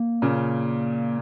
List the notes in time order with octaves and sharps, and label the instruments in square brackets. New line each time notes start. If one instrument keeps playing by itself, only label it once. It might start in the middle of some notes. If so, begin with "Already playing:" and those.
Already playing: [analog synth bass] A#3
[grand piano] A#2 C#3